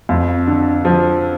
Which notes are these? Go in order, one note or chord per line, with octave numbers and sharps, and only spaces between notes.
F2
D3
F3